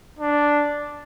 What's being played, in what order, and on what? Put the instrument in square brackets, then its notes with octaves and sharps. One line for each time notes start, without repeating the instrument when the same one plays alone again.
[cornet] D4